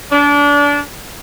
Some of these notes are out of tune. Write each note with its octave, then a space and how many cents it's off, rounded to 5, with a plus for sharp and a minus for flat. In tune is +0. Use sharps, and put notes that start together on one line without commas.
D4 -30